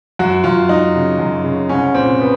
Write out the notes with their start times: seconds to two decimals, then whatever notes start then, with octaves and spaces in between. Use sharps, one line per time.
0.19 F#2 F#4
0.44 F#2 F4
0.69 F#2 D#4
0.95 C#3
1.19 F#2
1.44 C#3
1.69 C2 C#4
1.94 A#2 C4
2.20 B3